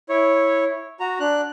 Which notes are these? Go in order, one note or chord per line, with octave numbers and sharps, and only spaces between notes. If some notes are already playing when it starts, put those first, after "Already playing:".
E4 C#5
F#4 A#5
D4 F#6